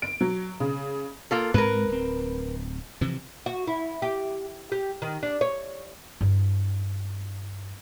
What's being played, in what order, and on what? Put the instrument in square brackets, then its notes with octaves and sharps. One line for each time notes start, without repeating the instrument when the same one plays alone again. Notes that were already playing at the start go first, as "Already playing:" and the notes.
[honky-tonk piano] D7
F#3
C#3
[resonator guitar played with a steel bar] A#3 F4 A4
[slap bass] G#2 G#3 C4 [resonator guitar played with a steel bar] A#4 B4
[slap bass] D1 C4
C3 E3 F3
[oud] F#4
E4
G4
G4
D#3
D4
C#5
[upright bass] G2 E4